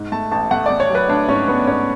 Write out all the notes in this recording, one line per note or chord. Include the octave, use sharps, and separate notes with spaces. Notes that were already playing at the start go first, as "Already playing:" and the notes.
Already playing: G#2
A3 A5
A1 A5
A3 F#5
D5
A3
C#5
F#3 B4
A3 D4
G#2 C#4
A3 B3
G#2 C#4